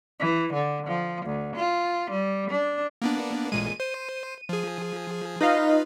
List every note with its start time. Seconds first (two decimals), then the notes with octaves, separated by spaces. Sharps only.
0.19 E3
0.53 D3
0.86 F3
1.26 D2
1.56 F4
2.10 G3
2.50 D4
3.02 A#3 B3 D4
3.52 A1 A#2 G#3 D#7
3.80 C5
4.49 F3 G#4
5.41 D#4 F4 B4 D#5 F5